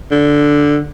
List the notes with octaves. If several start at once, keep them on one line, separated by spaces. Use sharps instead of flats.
D3